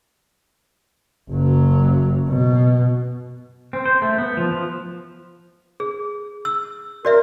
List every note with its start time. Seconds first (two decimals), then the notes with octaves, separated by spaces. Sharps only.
1.31 F#1 F#3
2.28 B2
3.73 C4
3.86 C5
4.02 A3
4.18 B3
4.37 F3
4.51 F3
5.80 G#4
6.45 E6
7.05 F#4 A#4 D5 E5